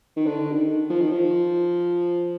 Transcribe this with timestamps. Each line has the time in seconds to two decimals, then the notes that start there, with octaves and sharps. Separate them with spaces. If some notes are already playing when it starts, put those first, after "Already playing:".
0.17 D#3
0.26 D3
0.52 D#3
0.90 F3
1.02 D#3
1.12 F3